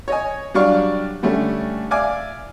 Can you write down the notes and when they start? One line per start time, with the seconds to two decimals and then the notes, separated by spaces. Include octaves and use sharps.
0.08 C#5 D#5 G#5
0.54 F#3 G3 D4 D5 F5 C#6
1.23 D3 G3 A3 C#4 D4
1.91 D5 E5 F5 G#5 D6